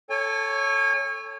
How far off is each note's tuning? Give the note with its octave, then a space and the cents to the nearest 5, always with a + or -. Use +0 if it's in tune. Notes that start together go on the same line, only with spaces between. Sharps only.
A4 +0 C#5 +0 G#5 -35